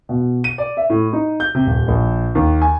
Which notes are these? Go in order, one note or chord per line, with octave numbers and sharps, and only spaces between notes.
B2
D#7
D5
E5
A2
D#4
G6
C3
D#1
A#1
D#2
G#5